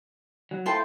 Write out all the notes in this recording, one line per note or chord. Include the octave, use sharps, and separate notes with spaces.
F#3
A3 E4 F4 C5 G5 A5